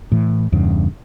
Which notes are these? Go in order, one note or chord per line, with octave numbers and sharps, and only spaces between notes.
A2 E3
E2 G2 C#3